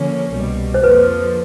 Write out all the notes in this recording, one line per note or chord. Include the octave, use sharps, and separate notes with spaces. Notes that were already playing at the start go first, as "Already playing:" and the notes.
Already playing: D3 F3 A#3 C#4
C2 B2 G3
C5
F2 D3 F3 A#3 B4